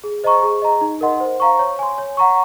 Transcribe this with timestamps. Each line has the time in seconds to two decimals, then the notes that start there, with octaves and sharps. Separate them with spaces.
0.04 G#4
0.24 C5 D#5 A#5 C#6
0.43 G#4
0.62 D#5 A#5
0.81 D#4
1.01 A#4 D#5 F#5 C6
1.20 C5
1.40 F5 A#5 C#6
1.59 C#5
1.79 G#5 C6
1.98 C#5
2.17 F#5 A#5 C#6